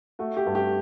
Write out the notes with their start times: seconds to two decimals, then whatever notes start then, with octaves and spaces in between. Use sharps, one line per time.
0.19 A3 F#4
0.37 G4
0.46 G2
0.55 G4